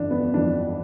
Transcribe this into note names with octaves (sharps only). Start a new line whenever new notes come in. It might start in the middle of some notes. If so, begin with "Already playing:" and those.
Already playing: G1 F2 E3 D4
B3
G1 F2 E3 D4